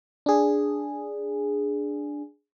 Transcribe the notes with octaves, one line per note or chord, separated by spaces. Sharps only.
D4 G#4